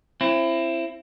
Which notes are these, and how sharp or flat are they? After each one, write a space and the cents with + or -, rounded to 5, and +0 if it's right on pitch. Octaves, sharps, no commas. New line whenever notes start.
C4 +25 E4 +25